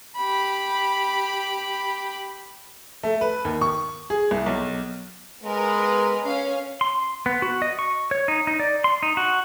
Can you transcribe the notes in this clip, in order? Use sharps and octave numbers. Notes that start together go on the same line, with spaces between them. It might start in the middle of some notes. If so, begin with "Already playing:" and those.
G4 B5
A3
B4
D#2
C#6
G#4
C2
B1
G#3 B3 A#4 B4
C#4 F5
C6
B3
F#4
D#5
C#6
C#5
D#4
D#4
D5
C6
D#4
F#4